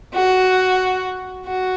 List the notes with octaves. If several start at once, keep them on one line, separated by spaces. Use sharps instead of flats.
F#4
F#4